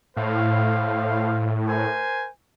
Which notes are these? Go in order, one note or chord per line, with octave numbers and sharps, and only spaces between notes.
A2 C5 F5
A#4 C5 G#5